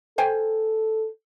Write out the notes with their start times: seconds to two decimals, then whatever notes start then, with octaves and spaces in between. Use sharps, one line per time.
0.18 A4 C5 G5 G#5